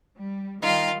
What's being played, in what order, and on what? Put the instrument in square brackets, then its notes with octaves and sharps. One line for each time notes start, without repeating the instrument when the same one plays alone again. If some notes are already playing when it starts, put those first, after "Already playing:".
[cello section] G3
[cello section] D#3 G3 [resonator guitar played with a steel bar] D#4 [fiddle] F4 [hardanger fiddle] F5 G5